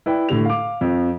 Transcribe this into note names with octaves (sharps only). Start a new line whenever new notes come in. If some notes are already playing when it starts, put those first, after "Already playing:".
E4 B4 D5 G5
A2 D3 G3 F7
F5 D6
F2 F3